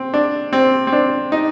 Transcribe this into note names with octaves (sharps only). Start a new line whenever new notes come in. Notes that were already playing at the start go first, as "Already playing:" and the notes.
Already playing: C4
D4
C4
C4
D4
D#4